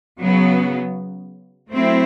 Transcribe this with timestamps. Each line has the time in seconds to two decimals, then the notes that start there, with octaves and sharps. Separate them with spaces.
0.20 C#3 F#3 B3
1.70 F#3 A3 C4 E4